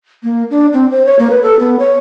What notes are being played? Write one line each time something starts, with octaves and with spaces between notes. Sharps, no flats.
A#3
D4
C4
C5
C#5
A#3
B4
A4
B3
C#5